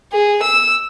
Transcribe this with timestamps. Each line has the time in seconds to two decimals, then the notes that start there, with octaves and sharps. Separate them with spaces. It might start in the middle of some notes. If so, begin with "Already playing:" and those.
0.12 G#4
0.42 E6